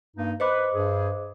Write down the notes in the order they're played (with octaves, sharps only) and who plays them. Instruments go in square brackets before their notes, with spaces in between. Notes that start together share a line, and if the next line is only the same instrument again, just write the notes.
[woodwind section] G2 A#3 D#4
[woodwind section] B4 [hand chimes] C5 D#5 D6
[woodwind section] G2 G#4